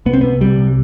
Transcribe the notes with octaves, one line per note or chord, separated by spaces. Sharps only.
C2 B3
C4
C3 B3
C2 G3
C3